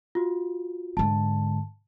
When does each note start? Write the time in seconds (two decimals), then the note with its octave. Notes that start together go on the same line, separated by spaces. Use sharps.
0.15 F4 F#4
0.97 G#2 D3 A5